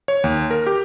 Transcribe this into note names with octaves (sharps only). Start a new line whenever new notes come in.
C#5
D#2
A#4
G4